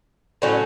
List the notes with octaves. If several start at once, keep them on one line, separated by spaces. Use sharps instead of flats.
A2 F#3 C#4